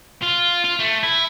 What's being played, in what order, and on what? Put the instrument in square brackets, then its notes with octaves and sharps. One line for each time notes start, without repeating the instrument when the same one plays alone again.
[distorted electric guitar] F4
F4
A3
E4